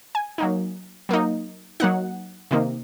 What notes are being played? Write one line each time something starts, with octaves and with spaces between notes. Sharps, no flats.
G#5
F#3 A#3 D#4
F#3 A#3 D#4
F#3 A#3 D#4 F#5
C3 D#3 A#3 D#4